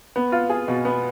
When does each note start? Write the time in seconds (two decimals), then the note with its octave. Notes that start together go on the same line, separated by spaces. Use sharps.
0.16 B3
0.32 F4
0.50 G#4
0.68 B2
0.85 B3